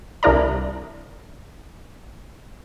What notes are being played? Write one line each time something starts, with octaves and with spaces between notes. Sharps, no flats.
C2 D4 E4 A#4 D5 A#5